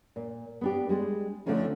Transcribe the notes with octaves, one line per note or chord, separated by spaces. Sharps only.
A#2
B3 D4 G4
G3 G#3 D4
D3 F3 A3 C4 C#4 D#4